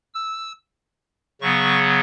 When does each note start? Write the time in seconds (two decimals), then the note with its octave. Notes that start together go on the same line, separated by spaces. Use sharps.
0.14 E6
1.41 C#3 F#3 B3 C#6